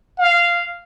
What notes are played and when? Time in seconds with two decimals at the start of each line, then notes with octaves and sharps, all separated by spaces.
0.19 F5